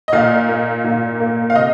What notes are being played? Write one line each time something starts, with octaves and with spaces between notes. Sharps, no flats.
D#5
A#2 F5
A#3
A#2
A#3
F5
C3 D#5